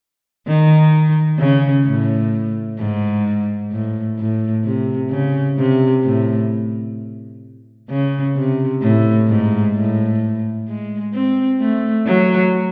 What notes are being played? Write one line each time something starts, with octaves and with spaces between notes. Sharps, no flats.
D#3
C#3
A2
G#2
A2
A2
C3
C#3
C3
A2
C#3
C3
A2
G#2
A2
G#3
C4
A3
F#3